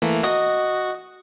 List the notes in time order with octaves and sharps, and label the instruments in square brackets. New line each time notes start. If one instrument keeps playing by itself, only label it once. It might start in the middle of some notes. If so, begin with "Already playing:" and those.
[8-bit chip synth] E3 A3 A#3
[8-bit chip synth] F#4 [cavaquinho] D#5